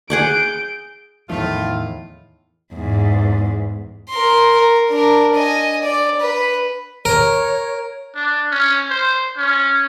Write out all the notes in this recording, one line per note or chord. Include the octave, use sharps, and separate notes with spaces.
G#4 F#5 D6 G6 D7
E2 A2 D#3 F3 A3 F4
E2 G#2
A#4 C6
A#4
D4 A#4
D#5 G#5
D5
B4
A#4 C#5
D4
C#4
C5
C#4